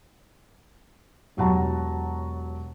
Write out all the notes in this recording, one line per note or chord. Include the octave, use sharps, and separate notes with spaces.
E1 F#3 G4 F#5 A5 A#5